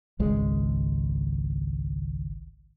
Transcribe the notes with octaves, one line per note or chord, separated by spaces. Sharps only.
G#1 C#2 G#3